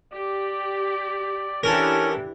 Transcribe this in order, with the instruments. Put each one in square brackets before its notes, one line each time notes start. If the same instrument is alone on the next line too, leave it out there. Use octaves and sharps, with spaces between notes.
[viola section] G4 [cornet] D5
[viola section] E3 D4 G4 [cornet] C#4 [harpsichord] A4 A#4